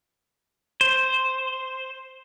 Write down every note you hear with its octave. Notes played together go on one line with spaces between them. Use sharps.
C5